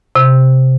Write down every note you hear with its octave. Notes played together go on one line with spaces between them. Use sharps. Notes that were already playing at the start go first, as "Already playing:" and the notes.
C3